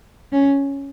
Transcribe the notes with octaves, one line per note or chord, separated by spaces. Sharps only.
C#4